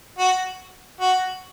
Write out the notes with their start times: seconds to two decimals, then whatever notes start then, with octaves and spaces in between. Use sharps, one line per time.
0.18 F#4
1.01 F#4